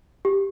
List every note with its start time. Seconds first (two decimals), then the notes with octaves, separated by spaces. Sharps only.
0.25 G4